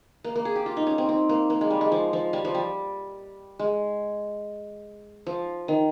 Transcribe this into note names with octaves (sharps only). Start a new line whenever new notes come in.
A#3
A#3
G#4
G4
F4
D#4
C#4
C4
C4
A#3
A#3
G#3
G3
G#3
F3
F3
G3
F3
G3
G#3
F3
D#3